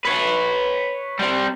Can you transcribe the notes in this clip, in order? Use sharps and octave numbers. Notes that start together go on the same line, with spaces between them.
B4 C#5
G3 C4